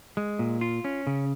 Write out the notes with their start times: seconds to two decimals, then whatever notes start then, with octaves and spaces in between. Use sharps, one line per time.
0.17 G#3
0.39 A#2
0.61 F4
0.85 C#4
1.07 C#3